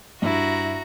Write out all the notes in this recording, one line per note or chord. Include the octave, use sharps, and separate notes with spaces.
G2 E4 F#4 A#5